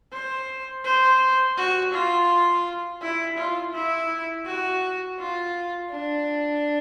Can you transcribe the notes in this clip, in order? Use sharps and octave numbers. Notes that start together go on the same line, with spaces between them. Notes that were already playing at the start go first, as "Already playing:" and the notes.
C5
C5
F#4
F4
E4
F4
E4
F#4
F4
D4